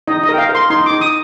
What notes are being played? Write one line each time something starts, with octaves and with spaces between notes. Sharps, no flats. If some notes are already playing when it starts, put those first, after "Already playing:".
D#4 D#5
D#5
A#4
G5
F5
A#4
C6
D#4 C6
D#4 D6
D#6